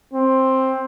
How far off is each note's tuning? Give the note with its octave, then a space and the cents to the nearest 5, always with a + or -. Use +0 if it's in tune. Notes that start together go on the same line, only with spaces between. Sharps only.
C4 +10